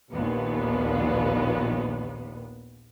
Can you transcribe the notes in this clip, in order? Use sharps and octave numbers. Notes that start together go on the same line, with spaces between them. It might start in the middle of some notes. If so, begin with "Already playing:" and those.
A#1 D#2 A#2 B3